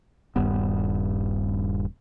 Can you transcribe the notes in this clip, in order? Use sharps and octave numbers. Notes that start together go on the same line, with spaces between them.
D#1 G2 B3